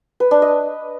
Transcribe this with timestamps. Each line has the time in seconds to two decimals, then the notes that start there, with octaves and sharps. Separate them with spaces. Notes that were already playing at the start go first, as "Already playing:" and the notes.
0.20 B4
0.31 D4
0.42 D#5